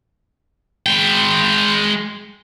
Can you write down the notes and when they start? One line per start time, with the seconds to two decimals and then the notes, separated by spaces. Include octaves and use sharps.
0.86 G#3 G5